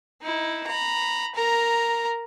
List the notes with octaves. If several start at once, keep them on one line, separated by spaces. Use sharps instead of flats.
D#4 E4
A#5 B5
A#4 A#5